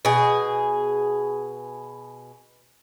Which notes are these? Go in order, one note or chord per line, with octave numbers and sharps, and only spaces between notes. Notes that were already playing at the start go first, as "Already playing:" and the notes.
B2 G#4